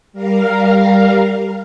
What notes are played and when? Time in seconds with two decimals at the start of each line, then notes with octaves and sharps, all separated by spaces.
0.13 G3 A#4 F5